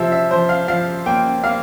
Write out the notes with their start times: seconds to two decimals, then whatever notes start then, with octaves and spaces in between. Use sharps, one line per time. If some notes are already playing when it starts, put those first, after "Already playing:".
Already playing: C3 F3 E5
0.12 E5
0.31 F3 C5
0.49 F5
0.68 F3 F5
1.06 A#3 G5
1.44 A#3 F5